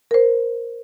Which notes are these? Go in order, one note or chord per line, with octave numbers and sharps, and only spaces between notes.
A#4 C5